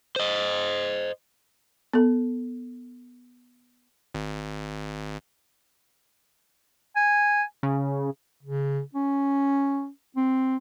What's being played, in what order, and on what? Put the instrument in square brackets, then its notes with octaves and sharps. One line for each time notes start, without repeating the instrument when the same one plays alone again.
[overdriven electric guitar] C5 D#5
[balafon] B3 A4
[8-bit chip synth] G#1
[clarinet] G#5
[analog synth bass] C#3
[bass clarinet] C#3
C#4
C4